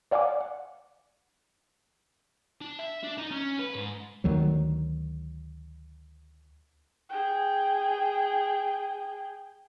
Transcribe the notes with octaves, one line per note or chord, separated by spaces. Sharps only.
C#5 D5 F5 F#5 G#5 D6
F#5
D4
E5
D4
D#4
C#4
B4
G#2
D2 D#3 F#3
G#4 G5